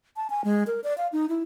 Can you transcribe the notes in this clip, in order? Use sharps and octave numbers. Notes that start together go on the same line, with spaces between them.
A5
G#5
G#3
A#4
D5
F5
D#4
E4